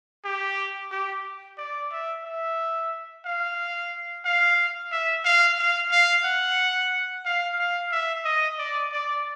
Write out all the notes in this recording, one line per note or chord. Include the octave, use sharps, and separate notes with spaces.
G4
G4
D5
E5
E5
F5
F5
E5
F5
F5
F5
F#5
F5
F5
E5
D#5
D5
D5